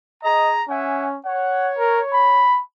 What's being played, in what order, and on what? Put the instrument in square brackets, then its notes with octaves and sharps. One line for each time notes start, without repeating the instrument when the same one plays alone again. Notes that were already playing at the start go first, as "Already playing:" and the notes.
[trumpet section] G#4 A#5 [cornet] D#5
[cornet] C#4 [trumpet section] E5 F#5 G#5
[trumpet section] C#5 [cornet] F#5
[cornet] A#4
B5